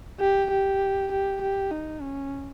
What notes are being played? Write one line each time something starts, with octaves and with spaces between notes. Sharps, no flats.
G4
G4
G4
G4
D#4
C#4